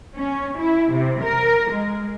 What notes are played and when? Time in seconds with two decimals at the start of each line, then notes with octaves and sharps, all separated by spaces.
0.15 C#4
0.59 E4
0.92 C3
1.22 A#4
1.71 G#3